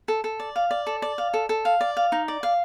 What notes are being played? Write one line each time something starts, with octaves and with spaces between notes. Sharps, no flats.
A4
A4
D5
F5
D5
A4
D5
F5
A4
A4
F5
D5
F5
D#4
D5
F5